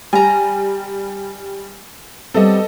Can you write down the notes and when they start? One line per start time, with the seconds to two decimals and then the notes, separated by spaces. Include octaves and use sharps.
0.13 G3 G#5 A#5
2.34 G3 B3 C4 A4 D#5